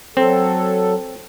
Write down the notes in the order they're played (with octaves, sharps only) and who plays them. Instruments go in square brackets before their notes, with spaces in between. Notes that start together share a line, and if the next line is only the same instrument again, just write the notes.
[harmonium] F#3 A4 [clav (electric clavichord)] C4